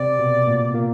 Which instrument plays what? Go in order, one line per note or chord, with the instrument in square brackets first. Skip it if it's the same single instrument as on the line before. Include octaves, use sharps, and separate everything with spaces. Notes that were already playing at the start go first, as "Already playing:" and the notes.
Already playing: [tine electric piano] C3 C4 [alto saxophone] D5
[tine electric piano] B2 B3
A#2 A#3
A#2 A#3